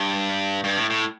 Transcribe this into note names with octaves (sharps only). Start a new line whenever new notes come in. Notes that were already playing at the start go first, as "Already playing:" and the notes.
Already playing: G2
G2
A2
A2